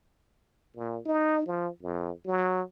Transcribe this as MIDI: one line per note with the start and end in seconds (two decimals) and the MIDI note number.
0.76 0.99 46
1.06 1.46 63
1.46 1.68 53
1.82 2.11 41
2.26 2.62 54